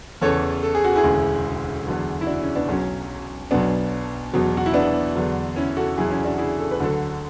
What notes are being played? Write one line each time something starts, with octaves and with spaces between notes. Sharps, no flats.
E2 C#3 E3 A4 C#5
A4
G#4
F#4
E4 G#4
E1 D2 C#3
E2 D3 F#3
E4
D4 F#4
C#4 E4
B3 D4
B1 B2 F#3 C#4
B1 B2 F#3 B3 D4
E2 B2 F#3
F#4
E4
B3 D4
E2 D3 F#3
C#4 E4
F#4 A4
E2 B2 F#3 E4 G#4
C#4 E4
D4 F#4
E4 G#4
A4
B4
D2 D3 F#3 F#4 A4